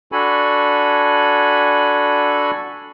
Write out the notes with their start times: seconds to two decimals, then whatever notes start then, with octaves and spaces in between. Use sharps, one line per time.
0.12 D4 F#4 A4 G#5 B5